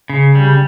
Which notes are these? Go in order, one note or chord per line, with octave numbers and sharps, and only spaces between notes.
C#3
G3